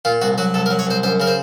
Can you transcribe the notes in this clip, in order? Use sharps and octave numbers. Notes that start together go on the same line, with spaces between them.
A#2 F4
C2 F#4
F#3 F#4
C2 A4
A#4
F#3
C#5
C2 C5
F#2 C5
C#3 A#4
C5